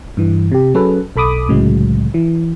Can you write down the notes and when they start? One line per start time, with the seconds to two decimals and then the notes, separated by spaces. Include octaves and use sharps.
0.17 G2 E3
0.52 C3 G4
0.74 F#3 C#4 G#4 A4 B4
1.16 B1 A4 B5 D6 D#6
1.48 C2 A2 C#3 F#3 G#3
2.14 E3